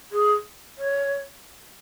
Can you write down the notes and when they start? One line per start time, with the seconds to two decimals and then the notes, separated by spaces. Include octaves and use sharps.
0.12 G#4
0.78 C#5